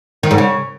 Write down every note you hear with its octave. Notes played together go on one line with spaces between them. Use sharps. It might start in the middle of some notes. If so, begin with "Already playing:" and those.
D#3
G#2
C#3